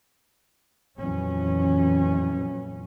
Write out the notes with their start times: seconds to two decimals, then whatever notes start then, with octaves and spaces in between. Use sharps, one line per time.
0.99 F2 A#2 E3 F#3 C#4